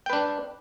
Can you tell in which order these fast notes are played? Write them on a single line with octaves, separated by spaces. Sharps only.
G5 B4 D4